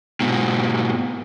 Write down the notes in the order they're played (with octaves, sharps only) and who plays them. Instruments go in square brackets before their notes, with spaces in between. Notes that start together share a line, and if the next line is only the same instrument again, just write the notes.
[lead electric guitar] G#2 B2